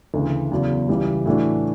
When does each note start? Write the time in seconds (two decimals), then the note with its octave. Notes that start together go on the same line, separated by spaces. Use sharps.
0.14 D2 C#3 E3
0.51 E2 C#3 F#3
0.89 C#2 C#3 E3 G3
1.26 A2 E3 A3 D4 F#4